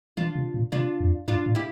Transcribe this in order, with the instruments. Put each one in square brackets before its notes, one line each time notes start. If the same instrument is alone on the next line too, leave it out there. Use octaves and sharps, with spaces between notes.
[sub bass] E3 [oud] D4 F4
[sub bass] C3
A#2
[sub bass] C3 [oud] D4 F4
[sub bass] F2
[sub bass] G2 [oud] D4 F4
[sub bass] A2
[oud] E4 G4